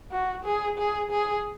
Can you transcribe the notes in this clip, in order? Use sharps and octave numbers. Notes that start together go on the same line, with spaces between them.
F#4
G#4
G#4
G#4